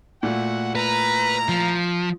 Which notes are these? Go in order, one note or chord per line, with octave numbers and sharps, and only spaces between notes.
A#2 A3 E4 F#4 F#5
E4 A#4 B4 A#5
F3